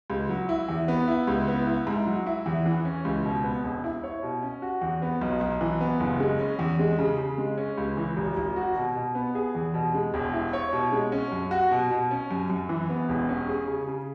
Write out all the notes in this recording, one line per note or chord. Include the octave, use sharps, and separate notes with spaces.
C#2
F#3
E4
E2
B3
E4
C#2
B3
E4
G#2
F#3
E4
E2
E3
C#4
C#2
B2
B3
E1
E4
C#5
B2
C#4
F#4
E2
B3
B1
B1
E3
B3
F#1
G#3
C#4
E2
G#3
C#3
C#3
G#3
C#4
C#2
E3
G#1
G#1
F#4
B2
B2
B3
G#4
E2
B2
G#3
E1
E4
C#5
B2
G#3
C#4
F#2
F#4
B2
B2
C#4
F#2
F#2
E3
B3
E1
C#4
G#4
C#3
C#3